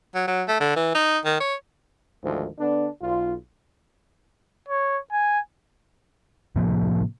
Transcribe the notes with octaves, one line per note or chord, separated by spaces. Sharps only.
F#3
F#3
A3
D3
E3
D#4
D#3
C#5
D2 G#2 D#3 F3
D3 B3 D4
B1 F4
C#5
G#5
A2 C3 F3 A#3